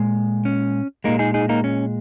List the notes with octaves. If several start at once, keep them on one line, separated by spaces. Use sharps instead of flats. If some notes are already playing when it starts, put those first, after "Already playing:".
Already playing: A#2 G#3
C#4
A#2 G#3 A#3 D#4
D#4 G#4
D#4 G#4
A#3 D#4
C#4